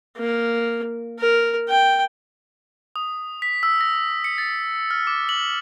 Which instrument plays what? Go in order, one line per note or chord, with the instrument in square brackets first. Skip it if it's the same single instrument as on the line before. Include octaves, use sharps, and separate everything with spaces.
[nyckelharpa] A#3
A#4
G5
[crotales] D#6
B6
E6
A#6
C#7
A6
F6
D6
F#7